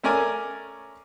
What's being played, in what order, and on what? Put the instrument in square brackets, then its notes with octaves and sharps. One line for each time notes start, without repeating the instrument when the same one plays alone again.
[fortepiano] A3 C#4 A#4 D5 G#5